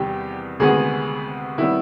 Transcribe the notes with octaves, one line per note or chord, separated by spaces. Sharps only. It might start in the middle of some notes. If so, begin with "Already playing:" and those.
Already playing: E2 C3 D#3 G3 B3 G4
D2 C3 D#3 G#3 B3 G#4
C3 D#3 G3 B3 E4